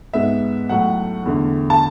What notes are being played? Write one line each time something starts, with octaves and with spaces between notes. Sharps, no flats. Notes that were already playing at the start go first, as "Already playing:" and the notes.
G#2 G#3 B3 E5
A2 F#3 A3 F#5
E2 D3 A3
A5